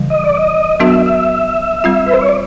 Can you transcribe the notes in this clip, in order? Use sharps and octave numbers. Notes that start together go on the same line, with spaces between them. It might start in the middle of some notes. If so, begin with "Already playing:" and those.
Already playing: C#3 E3 G3
D#5
D5
D#5
F#3 B3 D4 F#4 A#4 E5
E5
G3 C4 F4
B4
C5
C#5
D5